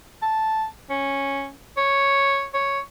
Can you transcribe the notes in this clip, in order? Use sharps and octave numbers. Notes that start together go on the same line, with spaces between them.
A5
C#4
C#5
C#5